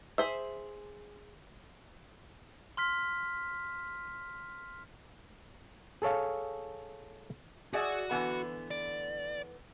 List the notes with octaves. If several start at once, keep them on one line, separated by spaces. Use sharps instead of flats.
G#4 C5 E5
C6 F6 B6
G#4 A4 C#5 F5
F#4 G#4 D5 E5 F#5
D3 E3 B3
D5